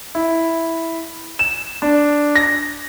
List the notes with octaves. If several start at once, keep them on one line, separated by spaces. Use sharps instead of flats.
E4
E7
D4
A#6